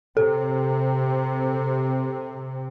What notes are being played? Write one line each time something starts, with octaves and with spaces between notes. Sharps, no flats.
C3 C4 A4